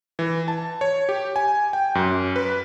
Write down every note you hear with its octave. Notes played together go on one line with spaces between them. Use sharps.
E3
A5
C#5
G4
G#5
G5
F#2
B4